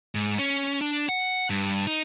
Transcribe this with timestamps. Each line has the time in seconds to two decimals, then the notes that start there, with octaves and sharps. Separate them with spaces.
0.15 G#2
0.39 C#4
0.81 D4
1.09 F#5
1.50 G2
1.87 D#4